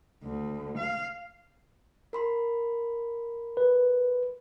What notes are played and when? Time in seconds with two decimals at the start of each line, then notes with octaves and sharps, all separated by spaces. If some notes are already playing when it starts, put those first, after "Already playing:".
0.23 D2
0.76 F5
2.13 A#4 B5 C6
3.57 B4